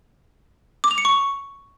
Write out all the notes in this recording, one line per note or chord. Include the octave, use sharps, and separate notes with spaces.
D6
F7
C#7
C#6